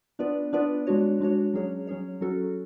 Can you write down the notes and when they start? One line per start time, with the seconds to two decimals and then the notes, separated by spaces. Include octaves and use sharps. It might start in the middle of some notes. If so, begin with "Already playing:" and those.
0.19 B3 D4 F4 B4 D5
0.53 B3 D4 F4 B4 D5
0.87 G#3 D4 F#4 C#5
1.20 G#3 D4 F#4 C#5
1.54 F#3 C#4 G#4 C#5
1.87 F#3 C#4 G#4 C#5
2.21 F#3 C#4 F#4 A4